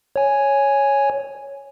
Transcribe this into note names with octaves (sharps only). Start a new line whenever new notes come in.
C#5 G#5